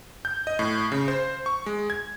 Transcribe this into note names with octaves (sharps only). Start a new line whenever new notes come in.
G6
D#5
A2
C#3
C5
C#6
G#3
G#6